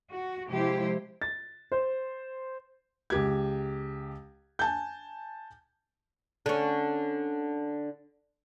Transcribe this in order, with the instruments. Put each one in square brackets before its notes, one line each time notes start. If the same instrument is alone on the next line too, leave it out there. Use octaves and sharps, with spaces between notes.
[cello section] F#4
C3 F3 G#3 E4 G4 C5
[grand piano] A6
C5
[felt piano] C#2 G4 G#6
G#5 A5 G6
[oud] D3 C#4